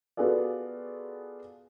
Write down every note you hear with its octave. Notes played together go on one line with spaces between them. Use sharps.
B3 F4 F#4 G#4 A4 D5